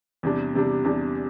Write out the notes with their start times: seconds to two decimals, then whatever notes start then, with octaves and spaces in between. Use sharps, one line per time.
0.23 E2 C3 G3 D4
0.54 E2 C3 G3 D4
0.84 E2 C3 G3 D4